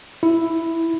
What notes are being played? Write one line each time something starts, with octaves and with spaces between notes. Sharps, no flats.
E4